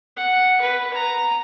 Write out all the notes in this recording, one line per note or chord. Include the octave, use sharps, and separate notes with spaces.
F#5
B4
A#5